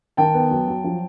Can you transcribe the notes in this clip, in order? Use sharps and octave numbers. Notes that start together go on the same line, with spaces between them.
D#3 G5 A5
B3
F#3
F#3
F3